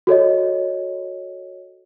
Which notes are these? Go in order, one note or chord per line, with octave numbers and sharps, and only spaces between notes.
F#4 A4 C#5 D#5